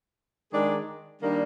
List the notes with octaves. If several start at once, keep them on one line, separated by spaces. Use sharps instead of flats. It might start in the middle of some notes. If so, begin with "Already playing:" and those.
D#3 G#3 D4 G#4
D#3 G3 A#3 D4